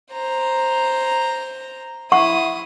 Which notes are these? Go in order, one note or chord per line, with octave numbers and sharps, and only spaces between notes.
C5 A#5
E4 F#5 C#6 D#6